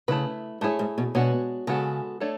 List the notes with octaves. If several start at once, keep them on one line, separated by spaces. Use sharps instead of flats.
C#3 A3 E4 B4
G#2 A3 E4 G#4 C#5
G#2
B2
B2 G#3 D4 F#4 C#5
C#3 G#3 B3 F#4 A4
A3 D4 A4 C#5